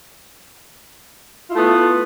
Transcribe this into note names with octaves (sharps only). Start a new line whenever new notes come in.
A3 B3 E4 F4